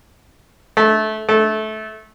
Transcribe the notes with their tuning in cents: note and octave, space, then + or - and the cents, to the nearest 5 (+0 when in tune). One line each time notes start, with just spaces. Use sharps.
A3 -20
A3 -20